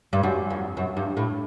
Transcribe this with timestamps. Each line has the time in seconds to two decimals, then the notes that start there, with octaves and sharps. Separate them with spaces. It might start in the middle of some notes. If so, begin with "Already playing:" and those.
0.13 G2
0.23 F#2
0.51 F2
0.77 F#2
0.97 G2
1.17 A2